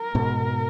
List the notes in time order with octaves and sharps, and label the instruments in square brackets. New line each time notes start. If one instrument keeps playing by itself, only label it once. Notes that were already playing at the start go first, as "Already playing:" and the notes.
Already playing: [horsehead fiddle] A#4
[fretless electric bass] G#2 B2